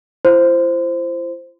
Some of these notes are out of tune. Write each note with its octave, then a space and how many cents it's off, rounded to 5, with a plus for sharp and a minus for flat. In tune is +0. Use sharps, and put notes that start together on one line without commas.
E4 +45 C5 +0 C6 -35